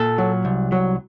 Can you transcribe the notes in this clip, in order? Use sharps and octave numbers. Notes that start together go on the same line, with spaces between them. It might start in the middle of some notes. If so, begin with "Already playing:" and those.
Already playing: A#2 A4
F#3
C2
F#3